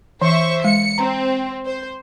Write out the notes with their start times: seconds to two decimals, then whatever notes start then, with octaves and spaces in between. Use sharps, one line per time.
0.22 E3 C5 E5 C#6
0.64 G#3 C#7
0.98 C4 A#5
1.66 C5